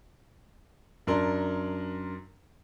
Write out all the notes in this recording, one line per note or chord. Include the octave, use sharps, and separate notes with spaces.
F#2 D4 A#4 C6